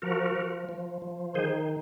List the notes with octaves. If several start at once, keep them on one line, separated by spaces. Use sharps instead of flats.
F3 F#4 A#4
F3
F3
F3
D#3 G#4 C5